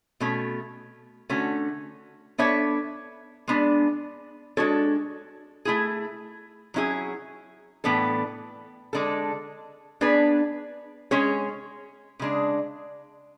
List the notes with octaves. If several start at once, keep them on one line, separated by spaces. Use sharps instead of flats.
B2 A3 C#4
D3 A3 C#4 F#4
B3 D4 A4 C#5 E5
G#3 B3 D4
G#3 D4 F#4 A4 C#5
A3 E4 G#4
F#3 C#4 E4 G#4
A2 E3 B3 D4 A4
D3 G#3 D4 A4
B3 D4 G#4 B4
G#3 C#4 G#4 C#5
C#3 G#3 D4